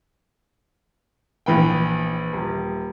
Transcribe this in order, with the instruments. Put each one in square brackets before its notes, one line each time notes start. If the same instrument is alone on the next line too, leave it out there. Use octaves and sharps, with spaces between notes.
[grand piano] A#1 E3 B4 G5
D#1